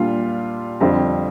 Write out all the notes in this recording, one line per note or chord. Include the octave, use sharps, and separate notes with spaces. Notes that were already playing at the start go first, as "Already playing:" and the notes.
Already playing: A#2 G3 D4 F4
F2 D3 G3 C4 F4